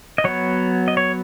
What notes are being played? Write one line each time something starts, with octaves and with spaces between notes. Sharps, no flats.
D#5
F#3 B3 C#5
D#5
C#5